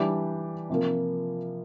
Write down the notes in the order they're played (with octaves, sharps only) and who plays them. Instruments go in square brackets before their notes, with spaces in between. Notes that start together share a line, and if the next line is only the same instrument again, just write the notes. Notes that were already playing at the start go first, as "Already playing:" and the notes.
Already playing: [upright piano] E3 G3 D4 G4 D5
C3 F3 A#3